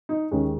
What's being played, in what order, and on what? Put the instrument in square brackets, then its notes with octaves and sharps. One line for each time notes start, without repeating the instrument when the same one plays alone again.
[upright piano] D#4
D#2 D#3 G#3 C#4